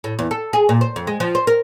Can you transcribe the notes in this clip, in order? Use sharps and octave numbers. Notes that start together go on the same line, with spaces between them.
A2
E2
A4
G#4
A#2
C5
F2
G#3
F3
C5
A#4